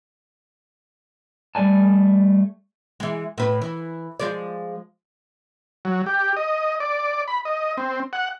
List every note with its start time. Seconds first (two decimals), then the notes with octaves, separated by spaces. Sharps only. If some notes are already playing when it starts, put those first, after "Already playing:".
1.55 G3 A3 D5 G#5 A5
3.00 E3 G#3
3.38 A2 B4
3.62 E3
4.20 F3 G#3 D5
5.85 F#3
6.06 G4
6.37 D#5
6.80 D5
7.28 B5
7.45 D#5
7.78 C4
8.13 F#5